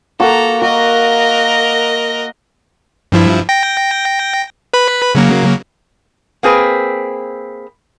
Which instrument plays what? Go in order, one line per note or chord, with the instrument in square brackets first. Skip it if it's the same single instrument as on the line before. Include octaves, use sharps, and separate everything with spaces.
[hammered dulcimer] A#3 F#4 [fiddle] A4 A#5
[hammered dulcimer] F#4 [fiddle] A#4 D#5
[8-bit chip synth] G2 F3 E4
G5 A#6
B4 B5
C#3 F#3 A#3
[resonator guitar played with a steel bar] A#3 C4 G#4 B4